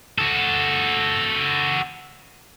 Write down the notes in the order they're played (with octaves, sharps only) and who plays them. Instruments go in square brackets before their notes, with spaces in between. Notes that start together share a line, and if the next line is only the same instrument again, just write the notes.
[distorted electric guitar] F#4 A4